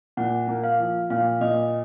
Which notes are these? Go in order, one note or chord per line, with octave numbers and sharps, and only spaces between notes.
A#2 F#5
A#3
F5
F3
A#2 F5
A#2 D#5